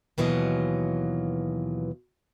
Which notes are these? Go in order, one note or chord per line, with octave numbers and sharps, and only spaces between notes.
D#2 B2 E3 F#3 F4 D#5